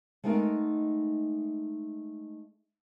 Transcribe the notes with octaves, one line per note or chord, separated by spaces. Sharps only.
G#3 A3 B3 D#4 A#4